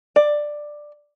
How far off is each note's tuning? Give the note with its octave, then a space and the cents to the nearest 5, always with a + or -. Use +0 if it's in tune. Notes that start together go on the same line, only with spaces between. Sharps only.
D5 +10